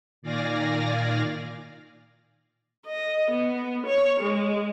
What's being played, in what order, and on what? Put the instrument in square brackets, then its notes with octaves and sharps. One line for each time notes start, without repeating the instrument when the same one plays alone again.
[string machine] A#2 D#3 D5 F5 G#5 A#6
[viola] D#5
B3
C#5
G#3